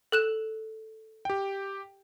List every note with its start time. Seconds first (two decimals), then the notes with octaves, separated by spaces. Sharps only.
0.12 A4 F#6 E7
1.25 G4 G5